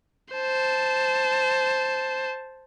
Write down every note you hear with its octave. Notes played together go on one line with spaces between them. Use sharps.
C5 A5